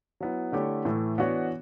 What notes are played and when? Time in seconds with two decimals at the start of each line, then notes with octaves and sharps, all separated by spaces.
0.20 F#3 B3 E4
0.52 D3 A3 E4 G4 C#5
0.85 A2 E3 A3
1.18 E3 B3 D4 F#4 C#5